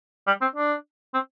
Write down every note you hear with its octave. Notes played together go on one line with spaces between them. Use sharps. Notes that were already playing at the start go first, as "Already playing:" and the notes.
G3
C4
D4
C4